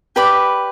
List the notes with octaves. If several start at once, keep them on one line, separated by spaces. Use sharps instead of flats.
G4 B4 D5 B5